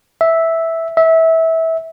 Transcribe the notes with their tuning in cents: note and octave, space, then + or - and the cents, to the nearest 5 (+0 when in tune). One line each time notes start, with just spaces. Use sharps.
E5 -5
E5 -20